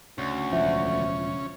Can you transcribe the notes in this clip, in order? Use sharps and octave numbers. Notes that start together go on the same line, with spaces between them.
D2 C#3 C#4
E1 F3 E5 C#6